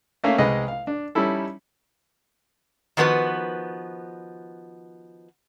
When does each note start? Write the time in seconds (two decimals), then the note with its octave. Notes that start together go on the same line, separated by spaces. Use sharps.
0.24 A3 A#3 C#4 E5 F5
0.38 C2 G#3 B4 D#5 B5
0.68 F5
0.87 D4
1.15 G3 C#4 D#4 E4 A4
2.97 D#3 F3 B3 F#4 B4